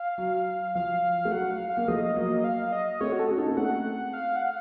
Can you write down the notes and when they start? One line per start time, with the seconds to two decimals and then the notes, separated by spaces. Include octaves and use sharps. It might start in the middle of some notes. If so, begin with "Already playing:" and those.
Already playing: F5
0.18 F#3
0.75 F3 F5
1.25 A3
1.31 F#3 F#5
1.50 F5
1.69 F5
1.77 A#3
1.88 F3 A3 D#5
2.16 F#3 A#3
2.44 F5
2.72 D#5
3.01 A3 C4 C#5
3.12 F#4
3.19 A4
3.29 C#4 F#4
3.38 D#4 A4
3.46 A#3 C#4
3.57 A3 C4 F#5
4.13 F5
4.36 F#5
4.42 F5